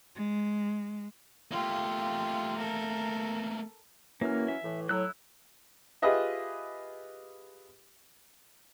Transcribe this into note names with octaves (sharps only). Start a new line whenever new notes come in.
G#3
A3 A#3 F4 G4
A4 A#4
E3 F#3 A#3 C#4 F6
E5
A2 E3
A2 F#3 E4 E6 F#6
F4 G4 G#4 B4 D#5 E5